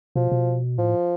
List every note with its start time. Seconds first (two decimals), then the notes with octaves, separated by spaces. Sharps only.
0.16 B2 F3
0.32 B2
0.78 A2 F3